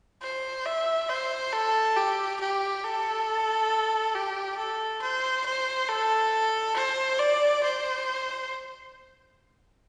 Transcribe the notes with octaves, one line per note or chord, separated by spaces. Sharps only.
C5
E5
C5
A4
G4
G4
A4
G4
A4
C5
C5
A4
C5
D5
C5